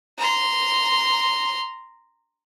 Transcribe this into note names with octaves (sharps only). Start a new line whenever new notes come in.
A#5 C6